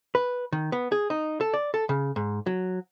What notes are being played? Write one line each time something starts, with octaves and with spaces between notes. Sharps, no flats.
B4
D#3
B3
G#4
D#4
A4
D5
A4
C#3
G#2
F#3